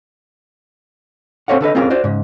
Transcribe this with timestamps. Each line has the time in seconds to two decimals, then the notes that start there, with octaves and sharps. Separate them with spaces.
1.48 C4 A4 C5 C#5 F5 F#5
1.61 D3 A4 B4 D#5
1.75 C4 C#4 F4 G#4 A#4
1.90 F#4 C5 D5
2.04 G#2 C#3